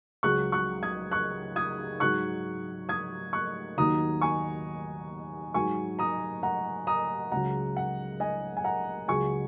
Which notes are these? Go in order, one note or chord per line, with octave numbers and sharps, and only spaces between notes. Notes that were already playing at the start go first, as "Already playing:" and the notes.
C#2 C#3 F#3 C#6 F#6
C#6 F#6
D#6 G#6
C#6 F#6
D#6 G#6
G#2 F#3 C#6 F#6
D#6 G#6
C#6 F#6
D#2 D#3 F#3 A#5 D#6
G#5 C#6
G#2 F#3 G#5 C#6
A#5 D#6
F#5 A#5
A#5 D#6
C#2 C#3 F#3 F#5 A#5
F#5
D#5 G#5
G#5
F#5 A#5
C#2 C#3 F#3 G#5 C#6